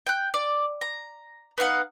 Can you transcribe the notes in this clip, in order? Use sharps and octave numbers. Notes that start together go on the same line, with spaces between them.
G5 F#6
D5
A#5
B3 D#4 F5 F#5